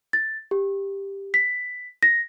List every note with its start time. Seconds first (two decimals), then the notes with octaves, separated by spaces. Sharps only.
0.13 A6
0.51 G4
1.34 B6
2.03 A#6